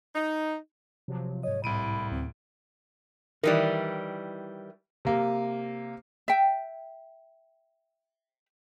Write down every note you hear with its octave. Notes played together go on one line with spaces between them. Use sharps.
D#4
C3 F3 F#3
G#2 C#5 D#5
C2 A2 B5 D7 D#7
D2 C4
D#3 E3 G3 A#4 D5
C3 A#3
E5 G5